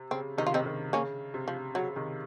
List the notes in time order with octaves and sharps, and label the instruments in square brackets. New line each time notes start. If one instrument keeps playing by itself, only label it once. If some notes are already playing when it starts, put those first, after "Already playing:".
Already playing: [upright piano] C3
[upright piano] C#3 [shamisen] C4
[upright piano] C3 D#3 [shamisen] D#4
[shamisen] F4
C4 D#4
[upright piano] C#3
C3 D#3
[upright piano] C#3 [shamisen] A#3 C#4
[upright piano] C3
[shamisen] F3
[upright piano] C#3 [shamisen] F#3
[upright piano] C3 D#3